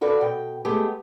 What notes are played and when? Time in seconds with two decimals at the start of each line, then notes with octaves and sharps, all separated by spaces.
0.01 F4 F#4 A4 B4 D5
0.21 B2 G5
0.65 G#3 A3 B3 G4 G#4